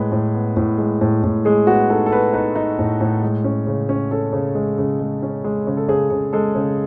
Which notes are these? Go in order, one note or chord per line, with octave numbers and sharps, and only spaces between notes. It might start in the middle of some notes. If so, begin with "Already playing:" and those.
Already playing: A2 G#3 B4
A2
B3
A2
G#3
A2
A2
G#3 G#4
B3 F#4
D#4 A4
A4
B3 B4
D#4 B4
D#4
A2
A2
G#3
C#4
C#3
C#4
C#4 A4
C#3
G#3
C#3
G#3
C#4
G#3
C#3
A4
C#3 G#4
C#3
G#3 A4
C#3